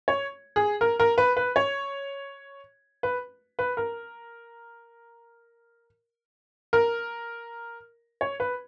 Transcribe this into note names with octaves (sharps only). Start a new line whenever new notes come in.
C#5
G#4
A#4
A#4
B4
B4
C#5
B4
B4
A#4
A#4
C#5
B4